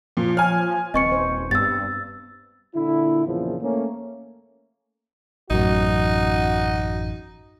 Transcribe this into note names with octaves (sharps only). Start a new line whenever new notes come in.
A#2 F3
C#5 G#5 F6
D#1 C4 B4 D#5 C#6 C#7
C5
G2 B3 E6 A6
A#2 D3 E4
A#1 E2 A#2 C#3 F3
A3 A#3 C#4
A1 F#2 D#4 F#4